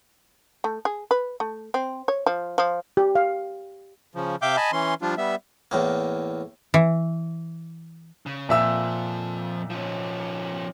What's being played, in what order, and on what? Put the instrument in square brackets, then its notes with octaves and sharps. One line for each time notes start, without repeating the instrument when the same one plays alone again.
[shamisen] A3
G#4
B4
A3
C4
C#5
F3
F3
[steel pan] G4
F5
[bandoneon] C#3 F3
C3 E5 F5 G5 D6 G6
D#5 G#5 A5 B5
E3 C#4 C6
F3 G3 D4 F4
G3 B3 E5
[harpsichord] E2 A2 A#3
[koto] E3
[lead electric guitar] C#3
[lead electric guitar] F2 F3 [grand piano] A#2 E5 E6
[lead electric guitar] F3 C#4